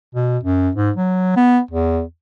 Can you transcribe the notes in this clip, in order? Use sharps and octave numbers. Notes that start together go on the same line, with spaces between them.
B2
F#2
G#2
F#3
B3
E2